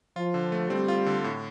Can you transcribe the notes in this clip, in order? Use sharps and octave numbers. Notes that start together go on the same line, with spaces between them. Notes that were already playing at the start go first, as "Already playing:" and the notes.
F3 F4
D3
A3
G3 C4
F4
D3
A2